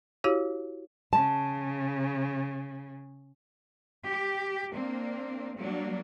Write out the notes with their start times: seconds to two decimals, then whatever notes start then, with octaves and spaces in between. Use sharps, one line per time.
0.24 E4 F#4 G4 C#5 F5
1.13 C#3 A5
4.08 G4
4.71 A#3 C4 D4
5.58 F#3 G3 A#3 D4